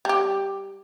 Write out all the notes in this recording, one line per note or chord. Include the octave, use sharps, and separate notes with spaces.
G3 G4